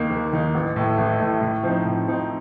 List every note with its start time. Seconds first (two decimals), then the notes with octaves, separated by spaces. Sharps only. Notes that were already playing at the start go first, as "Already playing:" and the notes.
Already playing: D#2 D#3 A#3 D#4
0.10 D#2
0.33 D#3 A#3 D#4
0.55 A1
0.76 A2 A3
0.98 A1
1.20 A2 A3
1.41 A2
1.64 F3 C4 D#4
1.85 A2
2.08 F3 C4 D#4